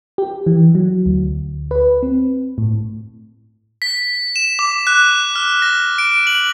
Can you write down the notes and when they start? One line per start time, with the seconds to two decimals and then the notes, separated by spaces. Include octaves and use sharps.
0.18 G4
0.46 E3
0.75 F#3
1.06 D2
1.71 B4
2.03 C4
2.58 A2
3.82 B6
4.36 E7
4.59 D6
4.87 F#6
5.36 F6
5.62 A#6
5.98 D7
6.27 F#7